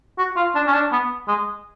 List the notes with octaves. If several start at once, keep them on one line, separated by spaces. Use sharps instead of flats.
F#4
F4
D4
C#4
D4
B3
G#3